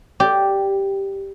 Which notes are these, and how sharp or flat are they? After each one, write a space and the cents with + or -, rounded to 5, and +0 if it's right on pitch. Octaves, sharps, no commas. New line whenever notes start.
G4 +0 D5 +0